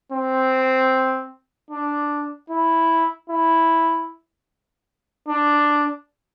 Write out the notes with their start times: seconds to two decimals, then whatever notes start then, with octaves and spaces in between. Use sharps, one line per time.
0.12 C4
1.71 D4
2.50 E4
3.30 E4
5.28 D4